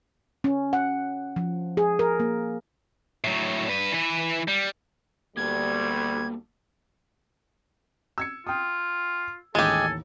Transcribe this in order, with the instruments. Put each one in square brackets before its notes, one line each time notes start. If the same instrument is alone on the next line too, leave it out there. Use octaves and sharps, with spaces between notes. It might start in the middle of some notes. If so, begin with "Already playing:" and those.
[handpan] C#4
F#5
F3
G#4
A#4
A#3
[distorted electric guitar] A2 F#3
G2 B4
E3 B4
G3
[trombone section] D2 G3 [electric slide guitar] A#3 B3 A4 [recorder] G#6
[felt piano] E6 G#6 C#7
[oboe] F4 [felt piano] G5 D#6
[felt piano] A1 D#2 [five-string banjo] G#3 G4 [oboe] A4 [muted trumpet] G#5